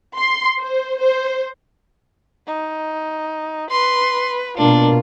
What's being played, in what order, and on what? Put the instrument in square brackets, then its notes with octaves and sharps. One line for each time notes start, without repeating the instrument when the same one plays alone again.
[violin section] C6
C5
C5
[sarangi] D#4
[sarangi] B4 [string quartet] C6
[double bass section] B2 A#3 [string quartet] D4 [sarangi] F4